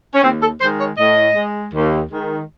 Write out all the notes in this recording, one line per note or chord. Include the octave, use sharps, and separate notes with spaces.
C#4
D#2 C4
A4
D#3 G#3 C5
C#5
A2 D#5
G#3
D#2
D#3 G#3